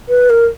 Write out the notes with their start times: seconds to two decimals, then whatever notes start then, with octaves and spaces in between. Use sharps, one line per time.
0.09 B4
0.30 A#4